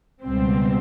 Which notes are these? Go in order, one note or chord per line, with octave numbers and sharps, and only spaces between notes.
C#2 B2 G3 C4